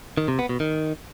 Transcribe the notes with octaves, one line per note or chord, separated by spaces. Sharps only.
D#3
C3
B3
B2
D#3